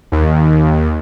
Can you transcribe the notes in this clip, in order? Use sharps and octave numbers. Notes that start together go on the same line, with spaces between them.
D#2